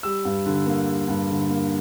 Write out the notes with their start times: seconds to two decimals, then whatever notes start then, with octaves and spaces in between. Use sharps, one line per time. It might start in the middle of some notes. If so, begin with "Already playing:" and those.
0.03 G3 E6
0.25 G2
0.46 D3
0.67 A#3
0.87 G3
1.08 G2
1.30 D3
1.50 A#3